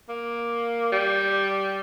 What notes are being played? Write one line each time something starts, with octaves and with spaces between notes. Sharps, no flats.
A#3
G3